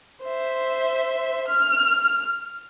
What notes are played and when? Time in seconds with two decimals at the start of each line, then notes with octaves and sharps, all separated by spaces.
0.23 C5 E5
1.48 F6